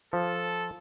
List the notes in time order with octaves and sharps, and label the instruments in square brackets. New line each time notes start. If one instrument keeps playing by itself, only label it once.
[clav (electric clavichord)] F3 [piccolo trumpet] A4